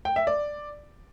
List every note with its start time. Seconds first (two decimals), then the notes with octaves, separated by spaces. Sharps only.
0.05 G5
0.16 E5
0.27 D5